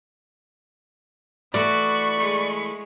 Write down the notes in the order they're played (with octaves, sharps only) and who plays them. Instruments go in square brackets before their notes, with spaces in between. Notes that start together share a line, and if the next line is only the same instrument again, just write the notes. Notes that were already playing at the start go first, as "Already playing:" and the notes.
[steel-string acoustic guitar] E3 A3 E4 [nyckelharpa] F#4 [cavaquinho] D5 [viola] B5 C#6
[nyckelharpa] G#3